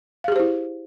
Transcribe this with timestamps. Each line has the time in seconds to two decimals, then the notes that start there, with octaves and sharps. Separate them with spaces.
0.24 F5
0.28 G#4
0.32 G4
0.36 C5
0.40 E4